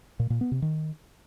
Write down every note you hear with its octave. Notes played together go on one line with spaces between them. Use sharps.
A#2
A#2
B3
C3
D#3